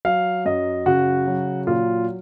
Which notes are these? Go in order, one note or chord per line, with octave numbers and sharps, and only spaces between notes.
F#3 F5
F#2 D#5
C#3 F#4
F#3
A#2 F4